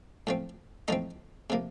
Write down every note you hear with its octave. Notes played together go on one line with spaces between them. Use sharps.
A2 F3 C4
A2 F3 C4 D#4 D#5
C3 F3 A#3